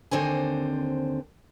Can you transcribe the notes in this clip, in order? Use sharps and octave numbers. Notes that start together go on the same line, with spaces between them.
D#2 D3 C4 C5 G#5